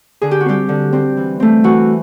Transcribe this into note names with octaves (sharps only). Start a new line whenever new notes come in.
D3 G#4
G4
F#4
G3 C4 G4
D3
G3 C4
E3
A3 C4
E3 F#4